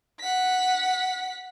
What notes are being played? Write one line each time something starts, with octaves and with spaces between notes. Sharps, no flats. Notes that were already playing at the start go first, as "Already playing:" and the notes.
F#5 B6